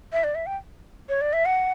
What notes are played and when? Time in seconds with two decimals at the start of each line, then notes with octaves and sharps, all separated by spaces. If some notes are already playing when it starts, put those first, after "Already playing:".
0.13 E5
0.24 D5
0.35 E5
0.46 G5
1.09 C#5
1.21 D5
1.33 E5
1.45 F#5